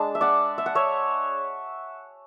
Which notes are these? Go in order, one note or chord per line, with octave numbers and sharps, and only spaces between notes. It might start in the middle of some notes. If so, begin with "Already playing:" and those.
Already playing: G#3 D4 A5
E5
D5 F#5
E5
F#5
C#5 E5